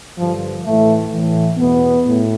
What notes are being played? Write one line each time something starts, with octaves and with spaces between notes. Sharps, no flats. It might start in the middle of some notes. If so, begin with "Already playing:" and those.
G2 D3 F3
A2 E3 A3
A2 E3
E2 B2 B3
A2